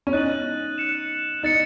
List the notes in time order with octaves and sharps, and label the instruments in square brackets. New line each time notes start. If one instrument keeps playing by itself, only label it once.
[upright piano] C#4
[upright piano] D#4 [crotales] F#6 A6 D#7 F#7
[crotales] F#6 C#7 E7
[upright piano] D#4 [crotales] F#6 A6 C#7